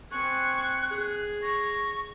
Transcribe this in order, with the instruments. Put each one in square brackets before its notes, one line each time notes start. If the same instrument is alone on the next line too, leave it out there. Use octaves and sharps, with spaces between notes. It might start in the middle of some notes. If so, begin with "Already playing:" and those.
[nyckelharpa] C4 G#5 [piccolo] C#6 [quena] F#6
[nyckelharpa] G#4
[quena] C#6 [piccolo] A#6